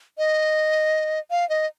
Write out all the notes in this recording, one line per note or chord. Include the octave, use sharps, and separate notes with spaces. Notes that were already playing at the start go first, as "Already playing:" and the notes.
D#5
F5
D#5